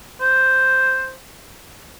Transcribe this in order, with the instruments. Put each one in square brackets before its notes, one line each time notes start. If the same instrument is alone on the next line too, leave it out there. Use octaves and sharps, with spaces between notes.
[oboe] C5